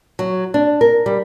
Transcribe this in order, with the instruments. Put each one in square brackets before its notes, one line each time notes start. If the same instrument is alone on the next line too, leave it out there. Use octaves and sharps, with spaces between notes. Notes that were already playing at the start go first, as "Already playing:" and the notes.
[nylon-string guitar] F#3
D4
A#4
G3